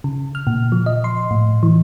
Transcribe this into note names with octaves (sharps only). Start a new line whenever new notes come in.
C#3
F6
A#2
F3
D#5
C6
A2
E3